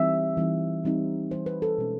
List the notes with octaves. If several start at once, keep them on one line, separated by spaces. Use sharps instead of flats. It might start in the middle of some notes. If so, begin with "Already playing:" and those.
Already playing: E3 G3 C4 D#4 E5
E3 G3 C4 D#4
E3 G3 C4 D#4
E3 G3 C4 D#4 C5
B4
A4
B2 G#3 C#4